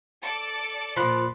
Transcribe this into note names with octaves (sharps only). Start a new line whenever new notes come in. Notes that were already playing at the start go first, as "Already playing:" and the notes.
A4 D5 D6
A#2 F3 B5 C6 F#6